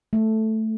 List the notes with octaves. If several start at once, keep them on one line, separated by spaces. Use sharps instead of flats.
A3